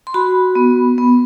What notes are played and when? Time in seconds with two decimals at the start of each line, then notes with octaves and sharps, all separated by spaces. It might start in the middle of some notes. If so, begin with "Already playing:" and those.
0.07 C6
0.14 F#4 B5
0.55 B3
0.98 B3